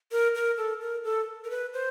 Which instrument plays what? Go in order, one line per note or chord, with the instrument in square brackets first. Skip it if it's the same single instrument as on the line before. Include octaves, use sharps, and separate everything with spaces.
[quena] A#4
A#4
A4
A#4
A4
A#4
B4
C5